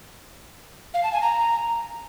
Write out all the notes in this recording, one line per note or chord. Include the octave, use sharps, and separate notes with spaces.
F5
A5
G#5
A#5